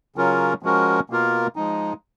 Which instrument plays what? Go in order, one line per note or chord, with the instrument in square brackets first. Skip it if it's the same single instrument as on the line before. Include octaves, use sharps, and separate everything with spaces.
[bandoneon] C#3 F#3 C#4 F4 A#4
F3 G#3 C#4 F#4 A#4
B2 A#3 F4 A#4
F3 G#3 D#4